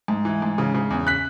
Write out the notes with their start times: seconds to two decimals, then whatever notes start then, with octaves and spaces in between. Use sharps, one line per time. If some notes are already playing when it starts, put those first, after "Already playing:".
0.08 G#2
0.25 E3
0.42 G#2
0.58 C#3
0.75 C#3
0.90 E2
1.07 F#6 B6